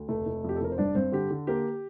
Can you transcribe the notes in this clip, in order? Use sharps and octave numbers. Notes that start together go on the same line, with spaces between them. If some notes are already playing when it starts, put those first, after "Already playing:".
Already playing: D2
F1 A3 A4
F1
F2 G4
A4
F1 A#4
C5
G2 D4 D5
G2 C4 C5
D3 G4
D3
A#3 G4